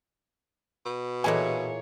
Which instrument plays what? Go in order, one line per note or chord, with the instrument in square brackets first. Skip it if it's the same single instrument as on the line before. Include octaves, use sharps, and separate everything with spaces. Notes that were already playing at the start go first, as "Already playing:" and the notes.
[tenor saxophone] B2
[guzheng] A#2 E3 A#3 [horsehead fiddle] G#4 C#5 [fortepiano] A4 D#5 G#5